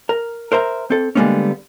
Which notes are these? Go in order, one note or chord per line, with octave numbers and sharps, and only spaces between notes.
A#4
A#4 C5 E5 A#5
C4 A4
D3 G3 G#3 A#3 B3 C#4